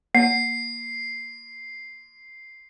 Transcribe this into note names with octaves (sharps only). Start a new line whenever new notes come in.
A#3 C7